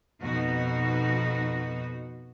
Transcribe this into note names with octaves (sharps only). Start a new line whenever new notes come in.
F2 B2 D#4 F#4